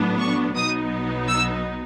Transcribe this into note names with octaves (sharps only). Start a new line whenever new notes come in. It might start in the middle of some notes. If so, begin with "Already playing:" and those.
Already playing: A1 A2 F#3 B3 D4
C#6
B1 B2 F#3 B3 D#4 D#6
E6